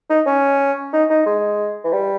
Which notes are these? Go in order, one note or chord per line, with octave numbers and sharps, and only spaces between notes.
D#4
C#4
D#4
D#4
G#3
E3
G3